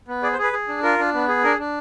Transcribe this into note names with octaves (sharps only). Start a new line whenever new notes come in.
B3
G#4 D5
C5
G#4 B4
G#4
D4
F4 A#4
D4
B3
G#4
D4 A#4
D4